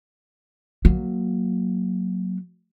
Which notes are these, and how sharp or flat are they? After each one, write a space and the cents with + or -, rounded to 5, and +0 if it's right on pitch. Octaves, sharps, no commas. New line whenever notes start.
F#3 +0 A#3 +0